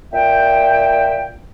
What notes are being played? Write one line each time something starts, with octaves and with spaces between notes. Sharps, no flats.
A#2 E5 G5